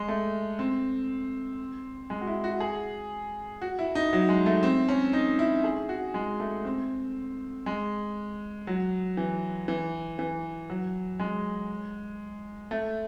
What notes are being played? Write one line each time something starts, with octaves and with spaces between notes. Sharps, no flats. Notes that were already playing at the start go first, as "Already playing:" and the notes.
Already playing: G#3
A3
C4
G#3
F#4
E4
F#4
G#4
F#4
E4
D#4
F#3
G#3
A3
C4
C#4
D#4
E4
G#4
F#4
G#3
A3
C4
G#3
F#3
E3
E3
E3
F#3
G#3
A3